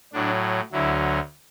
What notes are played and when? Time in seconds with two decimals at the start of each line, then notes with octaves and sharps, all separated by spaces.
0.13 A2 F#3 D4
0.72 D2 D3 F#3 E4